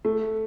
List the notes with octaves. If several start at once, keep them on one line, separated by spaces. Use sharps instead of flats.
A3